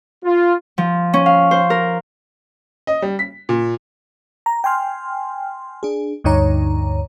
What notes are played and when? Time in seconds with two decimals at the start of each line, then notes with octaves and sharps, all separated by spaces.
0.24 F4
0.78 F3
1.14 C#4
1.26 F5
1.51 C5
1.70 A#4
2.87 D#5
3.02 G3
3.19 B6
3.49 A#2
4.46 A#5
4.64 G5 G#5 C6 F6
5.83 D4 G#4
6.24 D2 G2 D3 D#4 C#5 A#5